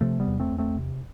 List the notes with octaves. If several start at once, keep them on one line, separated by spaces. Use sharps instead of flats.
C3 F3 A3
G3 B3
E2
A3 C4
E2
A3 C4
C3